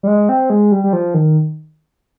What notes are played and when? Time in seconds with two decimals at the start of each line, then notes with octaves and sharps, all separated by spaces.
0.03 G3
0.07 G#3
0.29 C4
0.50 G#3
0.72 G3
0.84 G3
0.93 F3
1.14 D#3